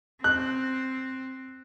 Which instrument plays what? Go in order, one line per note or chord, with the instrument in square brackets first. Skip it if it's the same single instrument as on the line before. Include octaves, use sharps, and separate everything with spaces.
[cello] C4 [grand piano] F#6